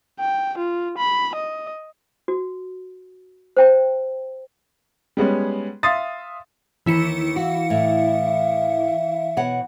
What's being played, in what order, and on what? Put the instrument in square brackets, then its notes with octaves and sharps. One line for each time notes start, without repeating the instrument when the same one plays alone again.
[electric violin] G5
F4
B5
D#5
[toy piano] F#4
C5 G5 A5
[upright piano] G3 G#3 B3 C#4
E5 F5 C6 D#6 A6
[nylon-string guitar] D#2 D#3 [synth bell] E3 E4 C#7
[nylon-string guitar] F#4 [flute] F5
[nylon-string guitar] A2 [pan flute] E5
[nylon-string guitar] B2 C#5 F#5